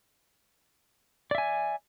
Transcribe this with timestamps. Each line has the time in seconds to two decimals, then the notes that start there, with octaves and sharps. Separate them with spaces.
1.31 D5
1.35 E5
1.38 G#5